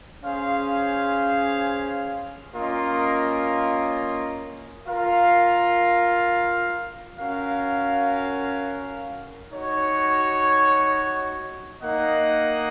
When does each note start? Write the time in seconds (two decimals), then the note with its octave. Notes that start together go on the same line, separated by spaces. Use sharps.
0.22 C#4 G#4 C5 F5
2.54 A#3 C#4 F4 A#4 D#5
4.87 F4 A#4 F5
7.18 C#4 F#4 A#4 F5
9.50 D#4 F#4 C#5
11.82 A#3 D#4 A#4 D#5 F#5